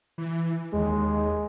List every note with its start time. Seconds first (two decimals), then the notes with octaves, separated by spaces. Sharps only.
0.18 E3
0.74 D#2 G#3